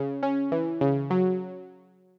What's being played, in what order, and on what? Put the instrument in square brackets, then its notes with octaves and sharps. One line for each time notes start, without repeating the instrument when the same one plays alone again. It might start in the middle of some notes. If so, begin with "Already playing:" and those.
Already playing: [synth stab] C#3
C#4
E3
C#3
F#3